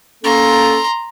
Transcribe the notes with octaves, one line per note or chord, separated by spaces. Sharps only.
A#3 C#4 A4 A#5 C6